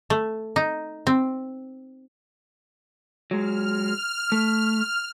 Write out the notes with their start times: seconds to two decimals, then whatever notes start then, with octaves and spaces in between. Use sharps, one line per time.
0.10 A3
0.56 D#4
1.07 C4
3.31 F#3 G#3 F6
4.32 A3